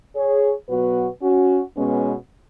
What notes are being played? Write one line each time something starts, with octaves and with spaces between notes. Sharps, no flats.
G#4 C#5
B2 F#3 B3 F#4 B4
C#4 F#4
B2 G#3 B3 C#4